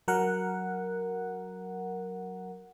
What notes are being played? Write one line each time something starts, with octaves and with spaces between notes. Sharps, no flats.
F#3 A#4 F#5